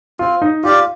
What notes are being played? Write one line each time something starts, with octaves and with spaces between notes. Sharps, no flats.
C4 F4
D#4
F4 G4 D5 F5